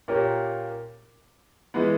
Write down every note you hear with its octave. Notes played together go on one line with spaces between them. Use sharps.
A#2 A#3 C#4 G4 A#4
E3 G#3 B3